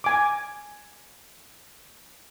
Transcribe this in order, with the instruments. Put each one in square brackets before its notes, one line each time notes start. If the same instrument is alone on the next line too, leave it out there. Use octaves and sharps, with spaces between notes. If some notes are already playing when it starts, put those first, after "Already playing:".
[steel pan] G#5 D6